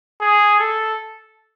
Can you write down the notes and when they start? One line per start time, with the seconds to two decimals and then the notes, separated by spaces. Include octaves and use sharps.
0.21 G#4
0.59 A4